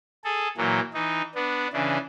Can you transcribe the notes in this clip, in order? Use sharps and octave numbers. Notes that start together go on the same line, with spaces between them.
G#4 A4
A#2 E3 F#3
E3 D#4
B3 D4
C#3 E3 D4